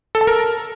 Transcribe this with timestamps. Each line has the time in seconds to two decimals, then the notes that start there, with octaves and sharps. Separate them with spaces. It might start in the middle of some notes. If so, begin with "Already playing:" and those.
0.15 A4
0.21 A5
0.27 A#4